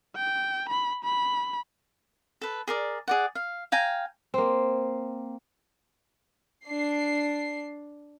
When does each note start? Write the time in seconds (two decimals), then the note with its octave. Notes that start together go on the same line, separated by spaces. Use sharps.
0.16 G5
0.69 B5
1.04 B5
2.41 A4 B4
2.68 G#4 A#4 D5
3.08 G#4 D5 F#5
3.35 F5
3.72 F5 G5 G#5 A#5
4.34 A#3 C4
6.65 D4 C7